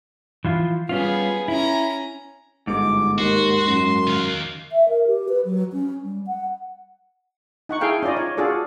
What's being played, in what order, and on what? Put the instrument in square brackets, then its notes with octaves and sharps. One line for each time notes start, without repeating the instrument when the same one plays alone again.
[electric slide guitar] E3 F3 F4
[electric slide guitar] G3 C#4 F4 [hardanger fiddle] B3 G#4
[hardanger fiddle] C#4 A#5 [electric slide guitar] E4
[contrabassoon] G1 [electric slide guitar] G#2 [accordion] D6
[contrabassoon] D#2 [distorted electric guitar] F#4 [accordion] C6
[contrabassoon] F#2
[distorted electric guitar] D#3 F5
[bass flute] E5
A#4
G4
B4
F#3
C#4
G3
F#5
[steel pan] D#4 F#5 C#6
E4 G#4 A4 F5 G5
C#4 D#4 F4 D5 D#5
C#5
D4 F4 F#4 G#4 A4 D5